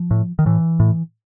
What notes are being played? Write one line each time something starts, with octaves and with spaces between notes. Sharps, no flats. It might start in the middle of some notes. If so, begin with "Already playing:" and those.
Already playing: F3
A2
D#3
A2 E3
A2